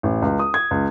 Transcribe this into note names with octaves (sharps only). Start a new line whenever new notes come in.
A1
C#2
D#6
G#6
C#2